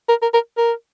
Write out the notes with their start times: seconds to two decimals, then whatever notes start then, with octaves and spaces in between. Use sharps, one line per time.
0.09 A#4
0.22 A#4
0.34 A#4
0.58 A#4